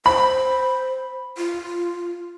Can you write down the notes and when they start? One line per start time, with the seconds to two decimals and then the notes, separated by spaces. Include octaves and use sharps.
0.06 C5 B5
1.37 F4